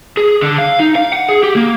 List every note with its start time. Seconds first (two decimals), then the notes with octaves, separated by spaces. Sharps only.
0.17 G#4
0.42 D3
0.58 F5
0.79 D#4
0.95 F5
1.13 F#5
1.29 G#4
1.43 G4
1.56 A#3